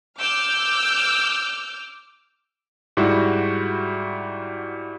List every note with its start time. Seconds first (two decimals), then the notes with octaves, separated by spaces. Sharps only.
0.19 D6 E6 F6 G6
2.97 G#2 G3 E4 F#4